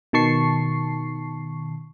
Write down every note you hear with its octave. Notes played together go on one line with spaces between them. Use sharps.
B2 D#3 A5 C#6 C7